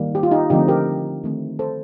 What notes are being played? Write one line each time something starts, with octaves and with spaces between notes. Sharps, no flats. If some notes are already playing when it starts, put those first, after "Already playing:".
Already playing: D#3 G3 A#3
G4
F4
D#4 G4
D3 F3 A3 C4 D#4 G4
G4 A#4
D#3 A3 C4
A4 C5